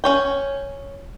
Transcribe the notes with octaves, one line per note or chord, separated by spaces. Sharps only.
C#4 C#5 G5